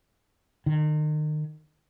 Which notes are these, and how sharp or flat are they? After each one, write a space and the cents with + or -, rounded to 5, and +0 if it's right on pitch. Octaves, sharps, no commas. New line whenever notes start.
D#3 -35